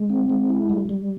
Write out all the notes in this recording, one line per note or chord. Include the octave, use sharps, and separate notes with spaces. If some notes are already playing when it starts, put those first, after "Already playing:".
Already playing: G#3
C4
G#3
E4
G3
G3